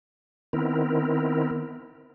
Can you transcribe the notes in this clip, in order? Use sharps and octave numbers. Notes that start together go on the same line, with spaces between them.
D#3 B3 C4 E4 A#4